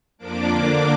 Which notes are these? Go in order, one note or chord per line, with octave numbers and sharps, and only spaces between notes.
F2 F3 A#3 D4 D6
D3 A#3 D4 D6